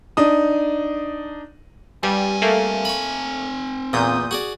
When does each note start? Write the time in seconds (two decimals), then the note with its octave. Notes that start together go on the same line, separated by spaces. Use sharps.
0.17 D4 D#4 D#6
2.03 G2 G3 C4 G#5
2.42 A3 A#3
2.85 B5 C#6
3.93 E2 A#2 D#6 G6
4.31 F#4 G#4 D5